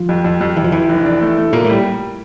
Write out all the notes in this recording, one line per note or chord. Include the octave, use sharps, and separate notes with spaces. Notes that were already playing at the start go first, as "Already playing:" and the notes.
Already playing: F3
F2
F2
F2
F2 E3
F3
F2 E3
F1
D4
A3
A3
A#2 A#3
A2 G3